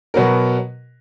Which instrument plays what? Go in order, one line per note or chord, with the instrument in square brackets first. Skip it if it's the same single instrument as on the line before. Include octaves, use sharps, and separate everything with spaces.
[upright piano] B2 F#3 B3 F#4 A#4